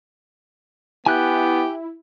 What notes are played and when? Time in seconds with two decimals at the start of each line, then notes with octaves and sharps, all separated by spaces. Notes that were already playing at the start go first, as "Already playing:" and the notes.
1.06 B3 E4 G4 G#5 F#6 G6